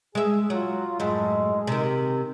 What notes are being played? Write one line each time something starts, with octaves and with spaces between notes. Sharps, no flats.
G#3 G#4 E5
F#3 F4
F#2 A2 G#3
C3 D#3